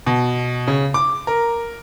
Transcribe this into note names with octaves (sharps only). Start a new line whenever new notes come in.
B2
C#3
D6
A#4